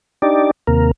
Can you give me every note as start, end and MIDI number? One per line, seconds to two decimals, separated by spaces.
0.22 0.51 62
0.22 0.51 63
0.22 0.51 67
0.22 0.51 74
0.67 0.91 39
0.67 0.91 48
0.67 0.91 58
0.67 0.91 70